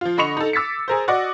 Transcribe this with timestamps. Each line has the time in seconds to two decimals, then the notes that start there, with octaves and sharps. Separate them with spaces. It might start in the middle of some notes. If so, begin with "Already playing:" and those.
0.01 F3 F4
0.17 D3 D#5 B5 C#6 C#7 F7
0.37 D#4 A4
0.53 D6 E6 A6 B6 C#7
0.88 G#4 A#4 C5
1.08 F#4 D5 D#5 F#5 D6